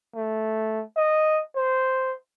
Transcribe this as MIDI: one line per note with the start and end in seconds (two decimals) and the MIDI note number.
0.15 0.83 57
0.96 1.42 75
1.56 2.15 72